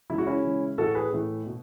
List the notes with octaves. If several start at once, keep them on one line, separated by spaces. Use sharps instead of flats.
C#3 E3 G#3 E4
F#4
C#4 E4
C#3 E3 G#3
A2 E3 A3 F#4 A4
G#4 B4
A2 E3 A3
B2